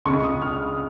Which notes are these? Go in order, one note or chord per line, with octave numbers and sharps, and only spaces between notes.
C#2 C#3 C#6
D#6
F6